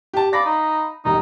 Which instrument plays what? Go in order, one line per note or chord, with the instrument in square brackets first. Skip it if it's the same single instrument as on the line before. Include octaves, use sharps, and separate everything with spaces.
[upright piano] G4 A5
[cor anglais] D5 [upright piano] F5 B5 A#6
[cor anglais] D#4
[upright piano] E1 G3 [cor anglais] D#4